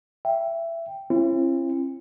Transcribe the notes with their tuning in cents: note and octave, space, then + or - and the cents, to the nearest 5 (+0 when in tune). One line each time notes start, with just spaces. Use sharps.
E5 +20 G5 +0
C4 +45 E4 +40